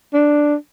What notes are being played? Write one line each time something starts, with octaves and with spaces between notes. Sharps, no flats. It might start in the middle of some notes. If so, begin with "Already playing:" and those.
D4